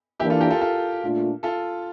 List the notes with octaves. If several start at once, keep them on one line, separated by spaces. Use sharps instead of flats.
E3 A#3 D4 E4 G4
F4 A4
G4 A#4
F4 A4
F4 A4
A#2 A3 D4 F4
F4 A4